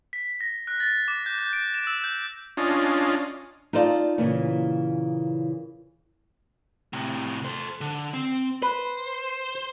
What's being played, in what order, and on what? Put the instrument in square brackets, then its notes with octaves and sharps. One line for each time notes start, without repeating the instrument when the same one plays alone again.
[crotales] B6
A#6
F#6
A6
D6
G6
G6
D7
E7
E6
G6
[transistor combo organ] C#4 D4 F4 D#5
[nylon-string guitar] D#4 F4 A4 C5 D5 F5
A#2 C#3 E3 A#3 C#4
[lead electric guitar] A2 C3
A4 C5
D3
C4
[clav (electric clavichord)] B4 [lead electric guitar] C5